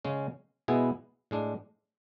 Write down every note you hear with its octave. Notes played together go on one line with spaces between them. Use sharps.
C#3 G#3 C#4
B2 G#3 B3 E4 G#4
A2 G#3 D4